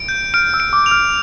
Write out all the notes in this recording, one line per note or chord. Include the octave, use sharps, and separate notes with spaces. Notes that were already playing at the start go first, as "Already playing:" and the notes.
Already playing: D7
G6
F6 D7
E6
D7
D6
F7
F6